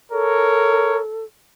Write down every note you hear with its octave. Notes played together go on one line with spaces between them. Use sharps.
A4 A#4 C#5